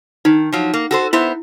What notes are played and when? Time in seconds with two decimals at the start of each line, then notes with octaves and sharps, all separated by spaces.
0.25 D#3 D#4
0.53 F3 F#3
0.74 A#3
0.91 F#4 A4 C5
1.13 B3 E4 C5 E5